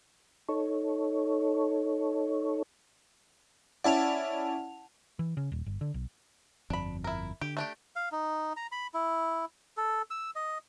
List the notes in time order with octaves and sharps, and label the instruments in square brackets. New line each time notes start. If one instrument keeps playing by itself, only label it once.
[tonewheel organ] D#4 A4 C#5
[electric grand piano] C#4 E4 D5 [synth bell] F#5 A5 F7
[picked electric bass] E3
C#3
D#1
G1
D3
B1
[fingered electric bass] G1 F2 [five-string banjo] D4 B5
[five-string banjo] E4 A#4
[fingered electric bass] D3 [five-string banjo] G4
[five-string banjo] A3 D4 G4
[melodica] F5
D#4
A#5
B5
E4
A4
E6
D#5